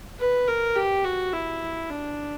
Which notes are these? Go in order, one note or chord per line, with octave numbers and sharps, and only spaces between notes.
B4
A#4
G4
F#4
E4
D4